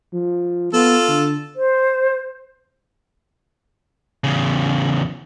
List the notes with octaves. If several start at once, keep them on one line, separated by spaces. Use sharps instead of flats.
F3
B3 F4 A4
D3
C5
E2 C#3